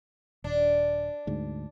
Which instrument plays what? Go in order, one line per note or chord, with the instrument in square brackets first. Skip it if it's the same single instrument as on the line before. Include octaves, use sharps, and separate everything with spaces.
[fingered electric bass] D#1 [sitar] D4
[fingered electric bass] D2 G#2